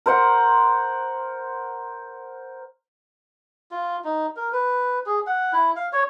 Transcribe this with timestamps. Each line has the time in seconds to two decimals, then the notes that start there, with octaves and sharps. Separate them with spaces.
0.06 A#4 C5 F#5
3.71 F4
4.04 D#4
4.36 A#4
4.52 B4
5.06 G#4
5.26 F#5
5.53 E4
5.76 F5
5.93 C#5